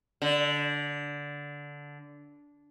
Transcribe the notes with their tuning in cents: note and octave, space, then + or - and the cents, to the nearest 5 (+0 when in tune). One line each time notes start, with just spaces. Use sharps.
D3 -15